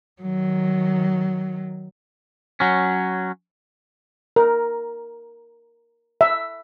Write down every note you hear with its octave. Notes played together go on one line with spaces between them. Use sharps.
D#3 F#3
F#3 C#4
A#4
E5